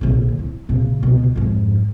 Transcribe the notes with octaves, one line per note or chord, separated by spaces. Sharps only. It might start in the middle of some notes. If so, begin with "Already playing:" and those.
A#1 D3
E4
A#1 C#3
C#2 B2
F2 G#2